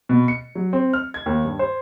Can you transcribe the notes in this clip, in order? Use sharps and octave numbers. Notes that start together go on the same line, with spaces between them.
B2
C#7
F#3
C4
F6
G#6
D#2
G2
C5